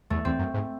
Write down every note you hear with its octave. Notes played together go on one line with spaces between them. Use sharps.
E2 A3
E2 C4
F#2
G#2